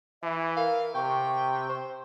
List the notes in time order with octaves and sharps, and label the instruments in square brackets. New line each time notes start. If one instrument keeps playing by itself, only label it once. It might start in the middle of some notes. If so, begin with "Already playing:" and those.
[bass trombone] E3 [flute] E5
[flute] A#4 [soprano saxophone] F5
[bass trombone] C3 [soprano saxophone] G5 [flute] C#6
[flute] C#6
[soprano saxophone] C5